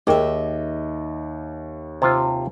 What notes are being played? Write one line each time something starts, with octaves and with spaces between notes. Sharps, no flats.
D#2 D#3 G#4 A#4 D#5 E5 G5 D6
C3 F4 C5